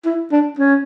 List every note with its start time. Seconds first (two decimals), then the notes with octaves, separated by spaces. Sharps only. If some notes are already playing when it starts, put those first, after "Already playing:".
0.05 E4
0.32 D4
0.59 C#4